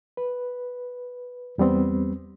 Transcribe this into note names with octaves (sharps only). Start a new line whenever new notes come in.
B4
E2 G3 B3 C4